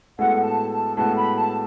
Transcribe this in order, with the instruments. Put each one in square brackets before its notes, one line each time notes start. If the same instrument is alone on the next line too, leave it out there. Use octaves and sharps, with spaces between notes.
[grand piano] A2 G#3 B3 F#4 A4 [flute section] F#5
[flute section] A5
A5
[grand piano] A2 G#3 B3 F#4 A4 [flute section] A5
[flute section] B5
A5